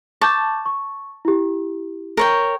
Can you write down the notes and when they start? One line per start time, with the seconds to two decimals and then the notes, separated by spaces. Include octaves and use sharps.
0.21 A5 C#6 D6 G6
0.66 C#6
1.25 E4 G4
2.17 A#4 C#5 G5